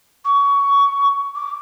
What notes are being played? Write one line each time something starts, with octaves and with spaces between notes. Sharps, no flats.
C#6
D6